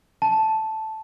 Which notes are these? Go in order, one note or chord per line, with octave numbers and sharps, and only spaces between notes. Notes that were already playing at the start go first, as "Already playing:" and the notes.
A5